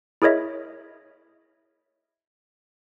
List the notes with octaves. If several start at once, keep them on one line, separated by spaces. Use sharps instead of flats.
E4 G#4 A#4 C#5 D#5 E5